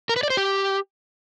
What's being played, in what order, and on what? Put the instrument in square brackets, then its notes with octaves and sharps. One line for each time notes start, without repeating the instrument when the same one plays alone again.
[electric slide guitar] A#4
B4
D5
C5
G4